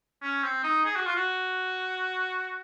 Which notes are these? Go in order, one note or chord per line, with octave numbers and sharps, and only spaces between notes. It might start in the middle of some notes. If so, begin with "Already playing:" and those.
C#4
C4
D#4
G#4
F#4
F4
F#4